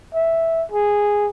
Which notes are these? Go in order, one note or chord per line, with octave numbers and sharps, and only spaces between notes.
E5
G#4